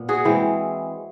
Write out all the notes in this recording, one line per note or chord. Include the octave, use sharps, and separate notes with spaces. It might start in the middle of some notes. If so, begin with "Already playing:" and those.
Already playing: A#2 B3
F#4 G#4
E3 G#3 C4 E4